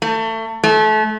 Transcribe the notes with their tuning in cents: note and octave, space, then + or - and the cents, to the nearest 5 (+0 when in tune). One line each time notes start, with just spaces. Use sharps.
A3 +30
A3 -30